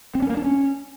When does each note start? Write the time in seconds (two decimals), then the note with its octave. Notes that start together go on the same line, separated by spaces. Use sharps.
0.15 C4
0.22 C#4
0.30 A#3
0.37 D4
0.44 C#4